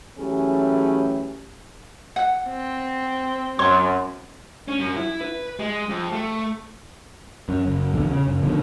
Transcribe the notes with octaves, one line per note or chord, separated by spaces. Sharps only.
E3 F#3 A3 C#4 G4 G#4
F#5
C4
F#2 C#5 C6
C#4
F#2
E4
B4
G#3
F2
A3
F#2
F#1
A#1 E2 D3
C#3
F#1
A#1 B2 D3 D#3